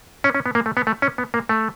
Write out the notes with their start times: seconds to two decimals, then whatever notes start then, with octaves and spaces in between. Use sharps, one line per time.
0.24 C#4
0.35 C#4
0.46 B3
0.55 A#3
0.66 A3
0.77 B3
0.87 A3
1.02 C#4
1.18 B3
1.34 A#3
1.49 A3